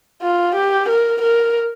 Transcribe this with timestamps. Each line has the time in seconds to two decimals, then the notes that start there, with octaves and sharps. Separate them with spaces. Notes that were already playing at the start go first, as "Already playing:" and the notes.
0.22 F4
0.55 G4
0.89 A#4
1.22 A#4